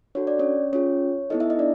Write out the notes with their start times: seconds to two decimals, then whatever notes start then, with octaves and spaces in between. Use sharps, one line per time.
0.15 D4 F#4 A4 C#5
0.27 D5
0.39 C#4 C#5
0.73 C#4 F4 G#4 C#5
1.30 B3 D#4 E4 A4 D#5
1.40 E4 E5
1.50 D#4 D#5
1.59 D4 D5